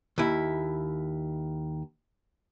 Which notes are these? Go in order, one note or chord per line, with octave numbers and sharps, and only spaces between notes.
D#2 E4